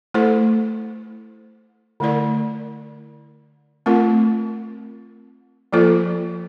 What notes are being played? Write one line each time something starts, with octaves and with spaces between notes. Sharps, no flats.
A3 E4 A4 C5
D3 A3 E4 A#4 D5
A3 C4 F4 A#4
F3 A#3 F4 A4 C5